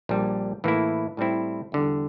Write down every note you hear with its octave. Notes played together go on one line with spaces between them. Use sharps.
A#1 A#2 G3
A2 E3 A#3 E4
A2 G3 C4 E4
E2 D3 G3